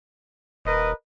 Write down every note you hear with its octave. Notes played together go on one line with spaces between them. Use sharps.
D#1 A#4 B4 D#5